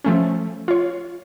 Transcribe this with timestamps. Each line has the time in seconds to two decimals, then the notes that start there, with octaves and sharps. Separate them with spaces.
0.04 F3 A3 C#4
0.68 F4 C#5